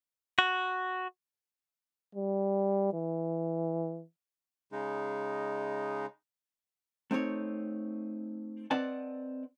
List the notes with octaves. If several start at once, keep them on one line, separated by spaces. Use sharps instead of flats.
F#4
G3
E3
C#3 G#3 D#4
A3 C4 D#4 C#5
C4 B4 D5 D#5 F#5 A5